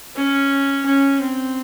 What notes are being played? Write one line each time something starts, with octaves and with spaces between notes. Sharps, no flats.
C#4
C#4
C4